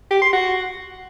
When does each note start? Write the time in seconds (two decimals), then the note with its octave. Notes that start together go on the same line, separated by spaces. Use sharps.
0.11 G4
0.22 C6
0.33 F#4